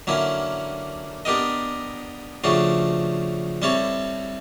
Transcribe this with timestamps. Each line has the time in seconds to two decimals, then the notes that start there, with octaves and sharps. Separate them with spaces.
0.07 D3 F#3 A#3 C#4 E4
1.25 B3 D4 G4 A#4 D#5
2.44 C#3 F3 A3 D4 F#4
3.62 G3 C4 E4 A4 C#5